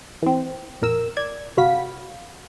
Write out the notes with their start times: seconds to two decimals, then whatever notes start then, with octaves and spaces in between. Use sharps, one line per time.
0.23 E3 C4
0.81 A#1 F2 A#4 E6
1.17 D5 G#6
1.57 G1 C3 F#4 F5 B5 B6